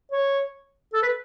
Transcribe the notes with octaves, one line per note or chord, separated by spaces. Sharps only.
C#5
A4
B4